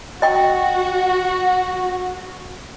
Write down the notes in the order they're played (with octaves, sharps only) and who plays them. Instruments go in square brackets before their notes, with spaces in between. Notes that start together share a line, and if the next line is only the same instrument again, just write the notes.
[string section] F#4 [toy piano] D#5 G5